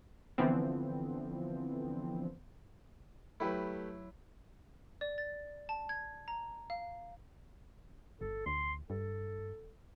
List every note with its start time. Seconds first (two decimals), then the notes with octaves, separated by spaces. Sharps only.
0.38 D3 E3 F3 B3 C4
3.40 F#3 A3 E4 G4 B4
5.01 D5
5.18 A6
5.69 A5
5.89 G#6
6.28 A#5
6.70 F5
8.21 G1 A4
8.46 D2 C6
8.90 G2 A4